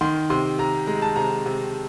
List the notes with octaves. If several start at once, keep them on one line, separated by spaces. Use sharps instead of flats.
D#3 C6
C3 C6
C3 A#5
G#3 A#5
A5
C3 A#5
C3